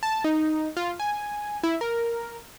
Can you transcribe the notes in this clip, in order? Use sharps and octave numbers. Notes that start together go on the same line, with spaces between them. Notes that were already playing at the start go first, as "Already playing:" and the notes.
A5
D#4
F4
G#5
E4
A#4